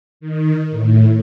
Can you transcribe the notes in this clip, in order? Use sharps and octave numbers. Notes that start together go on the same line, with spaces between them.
D#3
A2